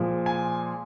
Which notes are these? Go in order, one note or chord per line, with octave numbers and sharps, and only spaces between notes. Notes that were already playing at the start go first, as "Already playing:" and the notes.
Already playing: A#2 F3 G#3
G#5